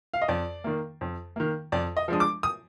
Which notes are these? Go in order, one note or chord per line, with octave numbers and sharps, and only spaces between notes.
F5
D#5
F2 D5
D#3 A#3
F2
D#3 A#3
F2 D5
D#5
F3 G#3 D4 D#6
D6
D#6